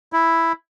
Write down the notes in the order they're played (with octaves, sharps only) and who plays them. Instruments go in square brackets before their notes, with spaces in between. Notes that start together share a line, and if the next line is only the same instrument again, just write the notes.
[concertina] E4